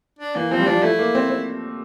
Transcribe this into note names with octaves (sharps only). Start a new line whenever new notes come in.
D4
E3 A#3
F3 C4
G3
F3 D4
A3 E4
A#3
C4
C4